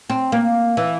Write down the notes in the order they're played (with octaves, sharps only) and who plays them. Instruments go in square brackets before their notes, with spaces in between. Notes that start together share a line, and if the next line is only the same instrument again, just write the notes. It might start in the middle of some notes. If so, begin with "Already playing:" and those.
[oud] C4
A#3
E3